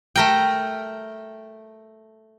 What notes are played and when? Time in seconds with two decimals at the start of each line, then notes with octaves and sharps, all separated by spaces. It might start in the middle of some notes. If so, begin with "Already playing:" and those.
0.16 A3 A#4 G5